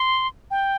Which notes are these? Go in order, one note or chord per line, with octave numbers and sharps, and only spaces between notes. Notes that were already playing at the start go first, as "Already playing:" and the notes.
Already playing: C6
G5